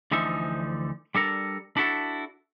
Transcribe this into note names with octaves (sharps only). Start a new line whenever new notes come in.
D2 D3 E3 F3 D#4 E5
G3 D4 A4 A#4
D4 E4 F#4 A4